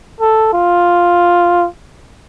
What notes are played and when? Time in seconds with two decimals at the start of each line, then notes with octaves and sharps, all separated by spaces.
0.20 A4
0.53 F4